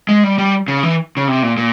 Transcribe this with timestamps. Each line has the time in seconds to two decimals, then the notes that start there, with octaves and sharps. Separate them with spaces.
0.09 G#3
0.23 G3
0.38 G3
0.68 C#3
0.83 E3
1.17 C#3
1.28 C3
1.43 A#2
1.57 A#2